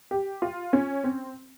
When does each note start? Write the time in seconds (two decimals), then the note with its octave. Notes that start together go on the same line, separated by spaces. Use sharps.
0.11 G4
0.42 F4
0.73 C#4
1.04 C4